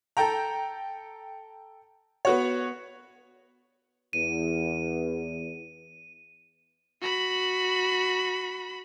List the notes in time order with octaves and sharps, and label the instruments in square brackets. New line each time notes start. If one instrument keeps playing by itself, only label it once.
[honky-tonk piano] A4 G5 A#5
B3 F#4 C#5
[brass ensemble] E2 [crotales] D#7
[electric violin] F#4 B5